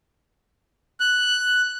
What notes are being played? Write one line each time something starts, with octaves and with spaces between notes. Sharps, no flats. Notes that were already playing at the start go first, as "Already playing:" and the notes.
F#6